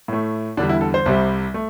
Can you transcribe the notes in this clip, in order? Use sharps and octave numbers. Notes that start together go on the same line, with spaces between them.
A2 A3
E2 D3 G3 D4
E4
A4
C5
C2 C3 G3
A3